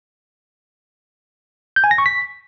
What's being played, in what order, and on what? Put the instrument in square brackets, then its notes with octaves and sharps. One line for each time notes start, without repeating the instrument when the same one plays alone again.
[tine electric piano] G6
G#5
A#6
C#6
B6